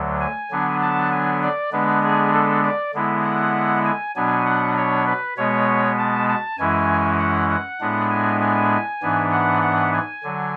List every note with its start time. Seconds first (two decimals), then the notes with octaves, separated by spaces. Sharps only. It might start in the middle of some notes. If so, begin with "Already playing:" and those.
Already playing: D2 D3 F#3
0.21 G#5
0.51 D3 F#3 B3 D4
0.82 A5
1.12 G#5
1.42 D5
1.72 D3 G#3 B3 D4 B4
2.03 G#4
2.34 A4
2.64 D5
2.94 D3 G#3 B3 E4
3.24 F#5
3.85 G#5
4.16 B2 F#3 B3 D4 G#5
4.46 F#5
4.77 C#5
5.06 B4
5.37 B2 G#3 B3 C#5
5.98 A5
6.29 A5
6.58 F#2 E3 G#3 C#4 E4 G#5
7.19 F#5
7.50 F#5
7.80 A2 G#3 B3 D4
8.11 G#5
8.41 G#5
9.02 G#2 E3 B3 D4
9.32 F#5
9.62 F#5
9.93 G#5
10.24 D3 F#3